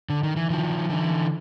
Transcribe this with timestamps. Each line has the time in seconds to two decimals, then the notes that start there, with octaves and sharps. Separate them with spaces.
0.09 D3
0.23 D#3
0.36 E3
0.50 D#3 F3
0.90 D3 E3